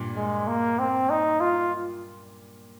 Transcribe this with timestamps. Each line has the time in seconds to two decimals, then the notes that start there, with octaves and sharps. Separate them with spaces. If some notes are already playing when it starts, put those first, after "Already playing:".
Already playing: G2 A#2
0.17 G#3
0.48 A#3
0.79 C4
1.10 D#4
1.40 F4